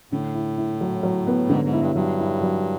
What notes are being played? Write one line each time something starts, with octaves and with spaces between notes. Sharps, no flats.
A2 D3
E4
E4
F#3
F#3
B3
G#2 D3
G#2
E4
G2
G2 F#3
E4
F#3